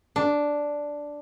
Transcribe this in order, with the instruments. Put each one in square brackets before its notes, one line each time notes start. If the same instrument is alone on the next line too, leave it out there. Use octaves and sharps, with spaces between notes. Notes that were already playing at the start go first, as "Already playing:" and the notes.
[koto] D4